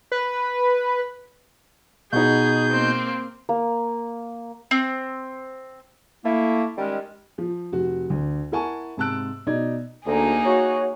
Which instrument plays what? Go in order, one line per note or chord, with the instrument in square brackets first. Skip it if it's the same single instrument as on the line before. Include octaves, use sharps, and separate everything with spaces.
[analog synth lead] B4
[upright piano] B2 D#4 [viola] G#4 [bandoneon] G6
[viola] A#3 C4
[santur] A#3
[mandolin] C4
[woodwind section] A3 A#3 E4
D#3 G3 G#3 C#4
[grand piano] F3
F1 F#4
D2
E4 A#4 F#5 G#5 A5 C#6
G#2 C3 A5 E6 F#6 D7
B2 D#4 D5 G#6
[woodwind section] D2 [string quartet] A#3 D#4 G#4
[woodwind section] F#4 C#5